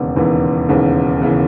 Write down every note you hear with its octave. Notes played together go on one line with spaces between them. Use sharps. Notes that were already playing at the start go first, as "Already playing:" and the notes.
Already playing: E1 D#2 C#3 E3 B3
E1 D#2 C#3 E3 B3
E1 D#2 C#3 E3 B3
C#3 E3 B3